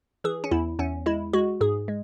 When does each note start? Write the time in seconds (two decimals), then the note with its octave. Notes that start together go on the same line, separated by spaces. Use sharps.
0.24 E3 G#4
0.44 C#4
0.51 E2 E4
0.79 E2 C#4
1.06 G#3 E4
1.33 G#3 F#4
1.61 G#2 G#4
1.88 G#3